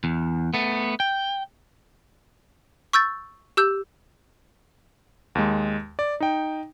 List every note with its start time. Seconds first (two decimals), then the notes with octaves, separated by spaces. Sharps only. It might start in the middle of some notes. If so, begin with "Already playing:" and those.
0.04 E2
0.54 A3 B3
1.00 G5
2.93 C#6 E6 G6 A6
3.57 G4 E6 G6
5.35 D#2 G#3
5.99 D5
6.20 D#4 G5